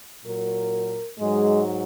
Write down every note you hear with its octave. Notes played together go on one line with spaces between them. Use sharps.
A#2 F#3 A#4
G#2 F#3 G#3